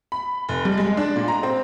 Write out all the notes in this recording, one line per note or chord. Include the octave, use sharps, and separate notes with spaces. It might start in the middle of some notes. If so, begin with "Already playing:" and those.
B5
F1
G3
G#3
D4
A#2
A#5
C4